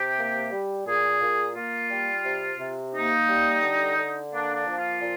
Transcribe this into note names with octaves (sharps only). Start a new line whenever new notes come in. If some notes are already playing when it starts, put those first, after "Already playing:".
Already playing: C3 G4
A#3
G3
A#2 G#4
A#2
A#3 F4
G3
C3
C3
A#3 D#4
G3
D3
D3
A#3 D4
D4
F3
F4
A#2